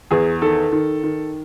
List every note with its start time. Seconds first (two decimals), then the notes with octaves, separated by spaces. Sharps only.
0.11 E2 G#4
0.42 D#3 A4
0.72 D#3
1.04 D#3